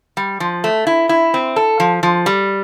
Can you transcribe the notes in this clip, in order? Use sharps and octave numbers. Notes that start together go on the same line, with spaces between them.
G3
F3
A3
E4
E4
C4
A4
F3
F3
G3